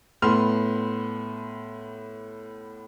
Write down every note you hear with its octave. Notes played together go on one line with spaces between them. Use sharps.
A2 B3 C6 F6